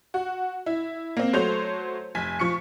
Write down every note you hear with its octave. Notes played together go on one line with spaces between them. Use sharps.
F#4
E4
A#3 C4
F#3 A3 C5 C#5 G6 F7
F1 G#5 B6
F3 C#6 C#7